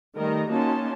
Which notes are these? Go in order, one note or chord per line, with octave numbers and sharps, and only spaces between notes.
D#3 G3 A3 A#4 D#5 A#5
A#3 C#4 D#4 F#4 A5 C6